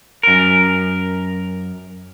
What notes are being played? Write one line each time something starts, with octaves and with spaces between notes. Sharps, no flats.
F#2 A#4